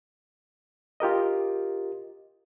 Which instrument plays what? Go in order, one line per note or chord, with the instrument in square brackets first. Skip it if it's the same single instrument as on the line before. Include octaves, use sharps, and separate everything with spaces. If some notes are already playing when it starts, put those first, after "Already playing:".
[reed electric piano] F4 G4 A#4 D#5